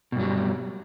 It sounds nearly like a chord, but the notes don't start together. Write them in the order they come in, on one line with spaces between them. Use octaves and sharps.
B2 G2 F#3 G3